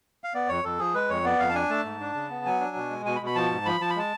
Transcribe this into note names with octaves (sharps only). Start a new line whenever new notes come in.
F5
B3 D5
F2 C#5
F2 A4
F3 G#4
G#3 B4
F2 C#5
B3 D5
F2 F5
A5
D4 G#5
A3 A5
G#2
D4
C#3
B3
F#3 G#5
D4
B2
G#3
B2 G#5
B5
B2
B5
F3 A5
G#2
F3 B5
F3 A5
B5
G#3 A5